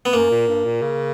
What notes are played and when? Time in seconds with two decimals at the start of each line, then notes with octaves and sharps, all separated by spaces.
0.05 B3
0.13 F#2 A#3
0.30 A#2
0.48 G2
0.64 A#2
0.82 C#3